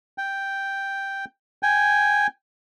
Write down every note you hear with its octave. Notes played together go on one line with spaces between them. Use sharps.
G5
G5 G#5